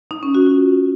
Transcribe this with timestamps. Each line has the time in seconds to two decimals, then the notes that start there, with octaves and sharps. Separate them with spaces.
0.11 D#4
0.23 C#4
0.35 F#4
0.46 F4